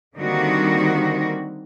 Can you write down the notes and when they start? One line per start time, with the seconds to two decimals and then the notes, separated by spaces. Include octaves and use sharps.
0.17 D3 D#3 G3 A#3 C4 F#4